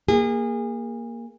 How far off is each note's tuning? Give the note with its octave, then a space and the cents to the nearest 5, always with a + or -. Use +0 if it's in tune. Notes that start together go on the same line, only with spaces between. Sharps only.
A#3 +0 G#4 -30